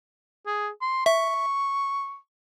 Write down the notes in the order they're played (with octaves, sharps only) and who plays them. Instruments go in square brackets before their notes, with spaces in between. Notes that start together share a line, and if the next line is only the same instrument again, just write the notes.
[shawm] G#4
C6
[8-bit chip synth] E5 [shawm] C#6